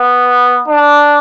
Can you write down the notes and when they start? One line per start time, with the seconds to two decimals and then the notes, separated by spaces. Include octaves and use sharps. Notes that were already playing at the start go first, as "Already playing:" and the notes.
Already playing: B3
0.68 D4